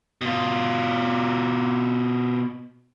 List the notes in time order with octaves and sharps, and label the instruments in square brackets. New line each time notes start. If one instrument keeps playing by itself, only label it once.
[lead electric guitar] B2 F4